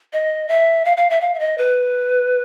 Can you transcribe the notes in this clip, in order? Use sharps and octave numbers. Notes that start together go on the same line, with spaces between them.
D#5
E5
F5
F5
E5
F5
E5
D#5
B4